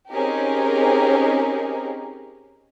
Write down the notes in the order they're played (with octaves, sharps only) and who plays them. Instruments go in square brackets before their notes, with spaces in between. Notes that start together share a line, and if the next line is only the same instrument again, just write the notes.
[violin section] C4 C#4 D#4 G4 G#4 A#4